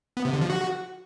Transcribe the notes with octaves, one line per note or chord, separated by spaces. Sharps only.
B3
C3
D3
F3
F#4